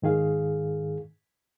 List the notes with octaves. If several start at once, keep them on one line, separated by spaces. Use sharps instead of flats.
G#2 D#3 G#4 F5